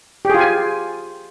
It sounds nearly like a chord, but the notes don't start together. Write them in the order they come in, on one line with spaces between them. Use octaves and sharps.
G4 G#4 F4 G#5